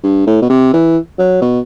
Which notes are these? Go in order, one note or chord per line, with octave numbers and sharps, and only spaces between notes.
G2
A2
B2
C3
E3
F#3
B2